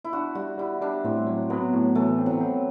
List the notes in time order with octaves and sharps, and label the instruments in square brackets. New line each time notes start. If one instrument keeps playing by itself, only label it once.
[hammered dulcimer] E4
[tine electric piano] D4 [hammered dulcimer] F#4
[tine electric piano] G3 [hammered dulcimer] F#4
[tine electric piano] G3 [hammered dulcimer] E4
[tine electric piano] G3 [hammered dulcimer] D4
[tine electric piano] A2 [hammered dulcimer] C4
[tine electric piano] F#3
[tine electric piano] F#3 [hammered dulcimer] B3
[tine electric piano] A2
[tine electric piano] E3 [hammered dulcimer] A3
[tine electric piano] C4
[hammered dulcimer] F#3
[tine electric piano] C4